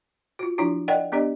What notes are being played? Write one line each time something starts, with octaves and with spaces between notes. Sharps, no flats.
F4 F#4
F3 F#3 D4 E4 F#4
A#4 D5 D#5 F#5 G5
B3 D4 G4 A#4 D5 D#5